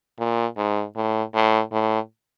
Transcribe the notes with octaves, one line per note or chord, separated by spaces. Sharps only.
A#2
G#2
A2
A2
A2